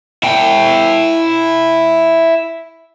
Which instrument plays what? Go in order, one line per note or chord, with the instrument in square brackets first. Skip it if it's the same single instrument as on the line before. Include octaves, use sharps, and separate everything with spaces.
[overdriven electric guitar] E4 G5